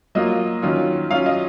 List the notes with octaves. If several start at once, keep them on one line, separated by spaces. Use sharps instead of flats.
F#3 A#3 F4 D#5
D#3 F#3 C#4 F4
F#3 C#4 F4 F5
D#5